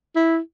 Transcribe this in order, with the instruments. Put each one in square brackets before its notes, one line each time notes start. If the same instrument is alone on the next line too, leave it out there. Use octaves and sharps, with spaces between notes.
[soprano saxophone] E4